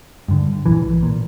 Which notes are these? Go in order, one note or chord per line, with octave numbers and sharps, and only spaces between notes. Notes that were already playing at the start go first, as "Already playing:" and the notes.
G2 D3
A#1 E3
A#2